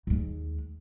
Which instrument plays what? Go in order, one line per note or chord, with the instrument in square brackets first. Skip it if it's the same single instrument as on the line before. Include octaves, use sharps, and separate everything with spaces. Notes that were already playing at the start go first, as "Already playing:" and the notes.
[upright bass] D#2 G#3